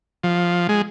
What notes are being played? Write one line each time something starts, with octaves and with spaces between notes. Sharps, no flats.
F3
G#3